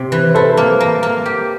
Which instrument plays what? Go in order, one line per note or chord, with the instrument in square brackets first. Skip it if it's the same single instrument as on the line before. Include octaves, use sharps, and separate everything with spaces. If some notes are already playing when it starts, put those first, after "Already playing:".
Already playing: [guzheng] C3 C4
E3
[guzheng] E4 [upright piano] A4 C5
[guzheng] A#3
A#3
A#3
G4